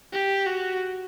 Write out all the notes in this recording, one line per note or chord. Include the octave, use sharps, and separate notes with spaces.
G4
F#4